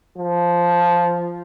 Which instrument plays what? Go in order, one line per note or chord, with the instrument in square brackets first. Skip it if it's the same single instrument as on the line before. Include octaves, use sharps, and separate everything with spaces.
[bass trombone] F3